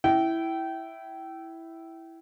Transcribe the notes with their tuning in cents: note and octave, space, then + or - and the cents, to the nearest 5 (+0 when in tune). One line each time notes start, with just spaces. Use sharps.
E4 +0 G5 -25